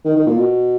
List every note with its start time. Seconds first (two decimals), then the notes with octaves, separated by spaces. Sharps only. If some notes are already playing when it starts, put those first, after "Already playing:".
0.05 D#3
0.16 D#3
0.27 A#2
0.38 B2